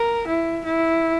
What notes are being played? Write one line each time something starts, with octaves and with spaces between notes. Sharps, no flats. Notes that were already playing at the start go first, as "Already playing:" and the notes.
Already playing: A#4
E4
E4